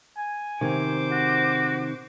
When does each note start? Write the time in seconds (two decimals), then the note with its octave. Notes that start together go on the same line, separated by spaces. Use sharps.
0.17 G#5
0.61 C3 D#3 C5 D6
1.11 F#4